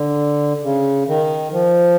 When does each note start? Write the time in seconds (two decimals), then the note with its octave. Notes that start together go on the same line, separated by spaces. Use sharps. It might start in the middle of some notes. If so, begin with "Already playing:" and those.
Already playing: D3
0.63 C#3
1.08 D#3
1.52 F3